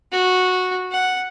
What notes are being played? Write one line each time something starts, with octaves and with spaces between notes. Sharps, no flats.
F#4
F#5